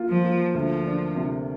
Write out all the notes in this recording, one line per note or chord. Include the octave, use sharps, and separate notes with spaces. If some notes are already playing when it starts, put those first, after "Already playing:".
Already playing: A#3 F4
F3
A#3
D2 F3
D4
C3